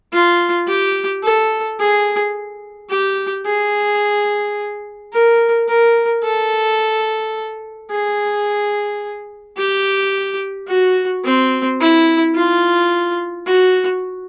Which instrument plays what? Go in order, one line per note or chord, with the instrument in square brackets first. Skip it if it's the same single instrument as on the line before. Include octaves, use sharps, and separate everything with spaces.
[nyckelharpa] F4
G4
A4
G#4
G4
G#4
A#4
A#4
A4
G#4
G4
F#4
C4
E4
F4
F#4